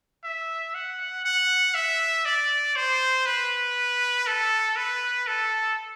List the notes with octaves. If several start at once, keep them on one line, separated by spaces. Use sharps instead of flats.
E5
F#5
F#5
E5
D5
C5
B4
A4
B4
A4